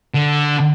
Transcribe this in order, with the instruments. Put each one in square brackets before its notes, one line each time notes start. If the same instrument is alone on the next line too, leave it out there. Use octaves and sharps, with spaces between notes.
[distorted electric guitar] D3